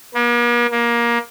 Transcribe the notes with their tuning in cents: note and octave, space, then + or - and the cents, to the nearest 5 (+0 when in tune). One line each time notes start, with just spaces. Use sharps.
A#3 +45
A#3 +20